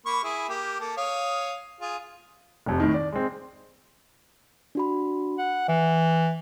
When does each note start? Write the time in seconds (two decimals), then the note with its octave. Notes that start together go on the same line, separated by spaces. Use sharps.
0.06 A#3 B5 C#6
0.24 E4 G#4 E5
0.49 A#3 G4
0.80 A#3 A4
0.97 C#5 F5 D#6
1.81 F4 G#4
2.66 F1 F2 C3
2.80 A2 D#3
2.94 D5
3.12 G#3 C4
4.75 D4 F#4 B5
5.38 F#5
5.68 E3 E5